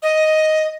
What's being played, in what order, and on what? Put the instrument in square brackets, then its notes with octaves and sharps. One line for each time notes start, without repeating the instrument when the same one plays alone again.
[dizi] D#5